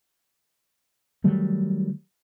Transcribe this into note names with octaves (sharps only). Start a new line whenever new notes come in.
D#3 F#3 G3 A3